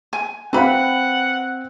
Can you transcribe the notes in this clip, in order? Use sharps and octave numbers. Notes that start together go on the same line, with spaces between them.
G#5
C4 B4 F5 F#5 B5